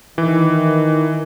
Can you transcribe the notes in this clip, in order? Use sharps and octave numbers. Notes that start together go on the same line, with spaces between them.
D#3 E3